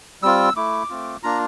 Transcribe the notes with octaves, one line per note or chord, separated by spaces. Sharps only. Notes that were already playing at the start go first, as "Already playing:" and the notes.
G3 C4 F4 E6
A3 E4 D6
A3 C4 F4
A#3 D4 F4 A#5